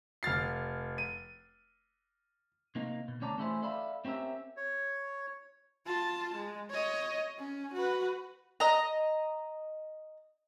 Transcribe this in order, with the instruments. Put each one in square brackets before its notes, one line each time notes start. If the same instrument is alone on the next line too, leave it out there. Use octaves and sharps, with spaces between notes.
[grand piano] F1 F6 A6 C7
D#7
[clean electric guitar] C3 A#3 D#4
B2
D2 C#4 C#5 D5 A5 A#5
E3 A3 C#4 E4 G#4 C5
A4 D5 E5 F5 B5
C4 C#4 G4 A#4 E5
[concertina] C#5
[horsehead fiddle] F4 A5
G#3
C#5 D#5
C#4
F#4 B4
[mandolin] D#5 A#5